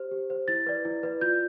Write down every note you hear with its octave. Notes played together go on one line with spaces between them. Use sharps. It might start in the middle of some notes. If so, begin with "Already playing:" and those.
Already playing: G4 C5
G4
C5
E4 A6
B4 D5
E4
B4 D5
F4 G6